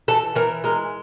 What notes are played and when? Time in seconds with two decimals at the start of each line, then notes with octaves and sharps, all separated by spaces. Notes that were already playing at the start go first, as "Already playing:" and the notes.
0.08 E3 A4
0.35 E3 A#4
0.64 G#3 A#4